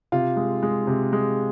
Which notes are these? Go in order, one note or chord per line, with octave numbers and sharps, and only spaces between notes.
C3 F4
G#3
G#3
C3
G#3